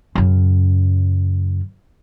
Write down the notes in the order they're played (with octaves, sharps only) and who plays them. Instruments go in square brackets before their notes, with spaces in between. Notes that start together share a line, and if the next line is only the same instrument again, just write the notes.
[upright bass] F#2 C#3